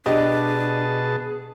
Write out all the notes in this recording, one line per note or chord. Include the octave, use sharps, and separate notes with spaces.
B2 D4 G4 G#4 D#5 A5